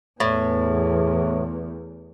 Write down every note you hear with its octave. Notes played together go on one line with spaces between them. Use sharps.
E2 A2